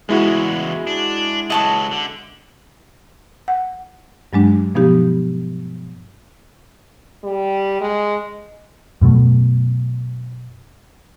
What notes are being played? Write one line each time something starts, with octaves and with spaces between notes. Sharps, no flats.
E2 C#3 G#3 E4 F#4
D4
C#2 F#3 D#5 A5 C#6
D3
F#5
G2 F#3 G#3 D4
B2 F3 B3 D#4 G4
G3
G#3
F#2 B2 F#3 A3